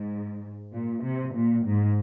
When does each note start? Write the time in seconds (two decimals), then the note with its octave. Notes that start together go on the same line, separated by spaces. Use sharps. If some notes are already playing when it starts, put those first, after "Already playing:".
Already playing: G#2
0.73 A#2
1.03 C3
1.34 A#2
1.65 G#2